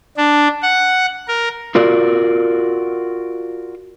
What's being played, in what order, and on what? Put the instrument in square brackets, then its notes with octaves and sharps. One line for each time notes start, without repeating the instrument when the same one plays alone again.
[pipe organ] D4
F#5
A#4
[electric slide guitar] F4 F#4 A#4 D5